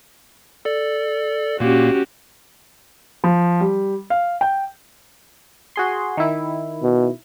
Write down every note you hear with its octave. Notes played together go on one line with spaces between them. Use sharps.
A4 D5
A#2 A#3 C#4 F#4 G4
F3
G3
F5
G5
F#4 G#4 C6
D#3 E4
B2